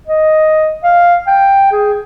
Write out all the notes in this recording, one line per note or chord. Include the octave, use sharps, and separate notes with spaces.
D#5
F5
G5
G#4